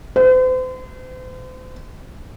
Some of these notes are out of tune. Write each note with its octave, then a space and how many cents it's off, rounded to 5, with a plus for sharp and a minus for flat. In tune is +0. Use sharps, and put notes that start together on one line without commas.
C5 -40